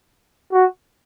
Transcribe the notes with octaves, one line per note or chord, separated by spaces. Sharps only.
F#4